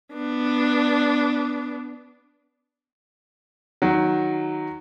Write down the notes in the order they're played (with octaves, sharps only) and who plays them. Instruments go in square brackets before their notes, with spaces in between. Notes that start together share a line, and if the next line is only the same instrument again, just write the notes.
[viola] B3 D4
[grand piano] D#3 F#3